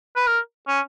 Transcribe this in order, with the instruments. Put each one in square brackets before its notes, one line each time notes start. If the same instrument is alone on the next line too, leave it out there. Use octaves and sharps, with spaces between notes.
[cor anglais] B4
A#4
C#4